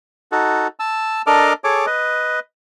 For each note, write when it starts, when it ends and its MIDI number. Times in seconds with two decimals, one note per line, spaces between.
0.32 0.67 63
0.32 0.67 66
0.32 0.67 69
0.80 1.22 81
0.80 1.22 88
1.27 1.53 62
1.27 1.53 69
1.27 1.53 70
1.27 1.53 75
1.27 1.53 86
1.27 1.53 89
1.64 1.86 68
1.64 1.86 69
1.64 1.86 73
1.64 1.86 86
1.86 2.39 71
1.86 2.39 75